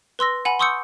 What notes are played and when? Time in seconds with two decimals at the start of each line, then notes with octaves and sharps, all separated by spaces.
0.19 B4 C6 E6 A#6
0.45 F#5 G#5 B5
0.59 C6 C#6 D#6 E6 G6 C#7